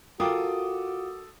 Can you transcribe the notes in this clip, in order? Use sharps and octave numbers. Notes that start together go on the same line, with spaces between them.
F4 F#4 A4 A#4 F#5 G5 D6 D#6